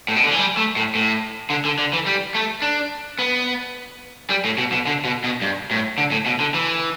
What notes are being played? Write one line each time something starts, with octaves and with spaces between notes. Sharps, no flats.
A2
B2
D3
E3
G3
A3
A2
A2
D3
D3
D3
E3
G3
A3
D4
B3
G3
A2
B2
B2
D3
B2
B2
G2
A2
D3
A2
B2
D3
E3